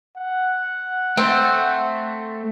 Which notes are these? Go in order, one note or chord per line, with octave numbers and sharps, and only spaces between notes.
F#5
A3 C4